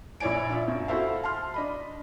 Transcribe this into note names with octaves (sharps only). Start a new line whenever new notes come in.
A#1 E4 C#5 D5 G#5 D7
D4 F4 E5
F#2
E4 F#4 A4 C5 E5 F5
A5 C6 F6
D4 D#5 B5